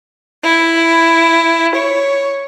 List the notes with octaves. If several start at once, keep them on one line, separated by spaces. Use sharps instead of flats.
E4
C#5